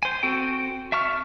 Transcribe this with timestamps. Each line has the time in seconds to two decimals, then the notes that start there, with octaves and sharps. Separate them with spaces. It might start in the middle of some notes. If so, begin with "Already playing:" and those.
0.03 C5 G#5
0.23 C4 F#4 A4 G5
0.92 E5 A5 C#6 F6